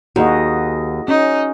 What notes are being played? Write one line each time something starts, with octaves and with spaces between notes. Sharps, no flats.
D#2 F#4 G#4 D#5
C#4 D#4